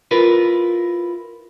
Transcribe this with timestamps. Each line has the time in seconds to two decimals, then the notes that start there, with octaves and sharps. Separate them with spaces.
0.11 E4 F4 A#4 B4